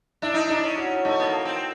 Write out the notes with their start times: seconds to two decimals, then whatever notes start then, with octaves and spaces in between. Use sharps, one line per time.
0.22 D4 E4
0.34 D#4
0.47 D4 D#4
0.63 C#4
0.78 F#4
1.05 A3 D#4
1.19 B3
1.25 A#3
1.45 C4